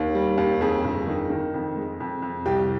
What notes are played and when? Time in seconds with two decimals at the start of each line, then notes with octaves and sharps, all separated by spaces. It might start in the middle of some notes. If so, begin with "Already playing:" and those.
Already playing: D#2
0.15 G3
0.38 D#2
0.61 F2 G#4
0.84 G1
1.07 D#3
1.30 D#3
1.54 F2
1.76 G#3
2.00 F2
2.22 F2
2.46 C2 G4